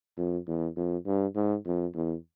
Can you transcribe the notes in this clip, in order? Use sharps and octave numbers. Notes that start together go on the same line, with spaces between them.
F2
E2
F2
G2
G#2
F2
E2